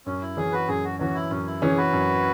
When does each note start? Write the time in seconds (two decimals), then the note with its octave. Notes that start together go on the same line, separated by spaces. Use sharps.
0.06 F#2 C#4
0.22 E4
0.37 E3 C#4 G#4
0.52 F#4 B4
0.68 F#2 G#4
0.84 F#4
0.99 E3 C#4 F#4
1.15 E4
1.31 F#2 C#4
1.46 E4
1.62 E3 C#4 G#4
1.77 F#4 B4
1.93 F#2